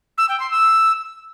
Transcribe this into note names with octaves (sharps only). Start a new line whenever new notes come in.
E6
G5
C6
E6